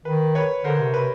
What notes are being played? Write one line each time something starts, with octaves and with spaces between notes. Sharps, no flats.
D#3 B4
B4 C#5
D3 A#4 C5
C3
C3 B4